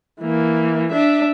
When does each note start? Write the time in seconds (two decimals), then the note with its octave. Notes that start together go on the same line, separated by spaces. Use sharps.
0.22 E3 A#3
0.92 D4 E5